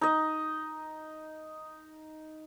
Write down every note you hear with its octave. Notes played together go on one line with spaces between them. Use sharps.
D#4 D#5